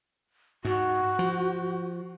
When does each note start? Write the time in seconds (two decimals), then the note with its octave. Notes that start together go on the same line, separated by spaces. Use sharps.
0.65 G#2 F#4
1.19 F3